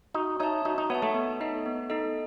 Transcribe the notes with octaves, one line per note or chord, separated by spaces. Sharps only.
D#4 F#4
D#4 C#5 E5 A5
D#4 F#4
D#4
B3 C#5 E5 A5
A3
B3
D#4 A4 D#5
B3
D#4 A4 D#5